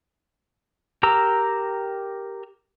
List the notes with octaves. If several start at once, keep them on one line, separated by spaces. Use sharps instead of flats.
G4 A#4 A#5 E6